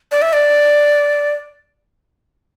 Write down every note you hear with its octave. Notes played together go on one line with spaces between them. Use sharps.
D5
E5
D5